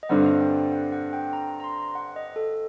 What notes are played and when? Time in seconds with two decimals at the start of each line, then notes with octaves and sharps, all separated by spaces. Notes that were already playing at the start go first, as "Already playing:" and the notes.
0.03 D#5
0.09 G2 D3 G3 C4 F#5
0.41 G5
0.72 F#5
0.92 F#5
1.13 G5
1.33 A#5
1.60 A#5
1.64 C6
1.95 F#5
2.16 D#5
2.36 A4